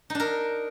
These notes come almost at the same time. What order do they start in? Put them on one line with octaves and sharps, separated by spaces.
D#4 D4 A#4